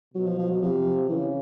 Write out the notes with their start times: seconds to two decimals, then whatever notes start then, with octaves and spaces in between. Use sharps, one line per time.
0.14 B2 F#3
0.26 F3
0.38 F3
0.50 F#3
0.62 C3 F3
1.09 C#3 E3